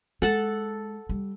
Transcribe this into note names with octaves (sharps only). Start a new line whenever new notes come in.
G#3 A4 F#5 A5
G3